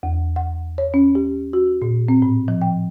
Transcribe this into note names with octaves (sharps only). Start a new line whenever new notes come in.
E2
F#5
C#5
C#4
G4
F#4
A#2
C4
A2
F3
G5